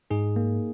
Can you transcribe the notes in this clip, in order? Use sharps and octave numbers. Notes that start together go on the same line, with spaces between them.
G#2 D#4 G#4
A#3